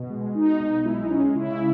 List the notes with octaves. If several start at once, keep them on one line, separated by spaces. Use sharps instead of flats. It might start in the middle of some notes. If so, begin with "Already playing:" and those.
Already playing: B2
G#3
B2 D#4
B1
G#3 E4
D#4
G#3 C#4
C#3 E4